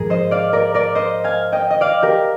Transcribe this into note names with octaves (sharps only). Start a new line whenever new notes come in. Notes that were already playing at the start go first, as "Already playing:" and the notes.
Already playing: G#2 F3 G#3 G#4 A#4
C5 D#5
D5 F5
A#4 D5
A#4 D5
C5 D#5
F5 G#5
D#5 G5
D#5
D5 F5
G4 A#4